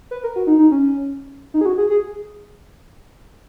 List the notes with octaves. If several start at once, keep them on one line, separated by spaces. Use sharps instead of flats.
B4
A#4
F#4
D#4
D#4
C#4
D#4
G#4
F#4
G#4
G#4